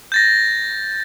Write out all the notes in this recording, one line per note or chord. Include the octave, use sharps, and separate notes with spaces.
G6 A6 A#6